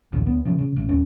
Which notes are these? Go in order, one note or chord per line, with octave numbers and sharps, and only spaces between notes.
A#1 D#2 A#2 D#3
D2 B3
C#3 F3
C#3
A1 A2
D#1 C#4